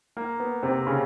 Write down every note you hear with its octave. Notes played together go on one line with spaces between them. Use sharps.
A#3
B3
C3 C4
C#3 C#4